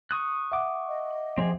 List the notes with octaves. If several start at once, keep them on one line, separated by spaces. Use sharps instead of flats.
C#6 D#6 F#6
E5 F#5 D6
D#5
F3 C4 G4 G#4